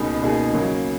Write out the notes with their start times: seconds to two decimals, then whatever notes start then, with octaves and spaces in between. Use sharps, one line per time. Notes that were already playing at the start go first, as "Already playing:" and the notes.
Already playing: C#2 B2 A#3 D#4 G#4
0.22 C#2 B2 A#3 D#4 G#4
0.53 C#3 F#3 A#3